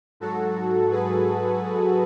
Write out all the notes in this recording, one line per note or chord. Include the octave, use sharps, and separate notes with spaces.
G#2 F#3 F#4 A4
G#4 B4